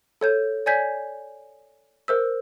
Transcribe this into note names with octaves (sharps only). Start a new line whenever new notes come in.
A4 C#5 G6
C#5 D5 G#5 G6 G#6 B6
A#4 C5 E6